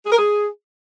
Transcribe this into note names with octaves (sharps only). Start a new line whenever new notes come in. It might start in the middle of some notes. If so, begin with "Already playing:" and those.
G#4
A#4
G#4